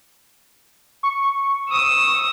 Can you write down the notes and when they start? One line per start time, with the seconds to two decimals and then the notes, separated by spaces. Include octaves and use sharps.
1.03 C#6
1.69 D#6 E6